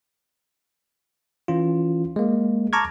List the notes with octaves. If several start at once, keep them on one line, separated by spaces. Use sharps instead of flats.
E3 C#4 F4
G#3 A#3
A5 A#5 C#6 D6 F6 G#6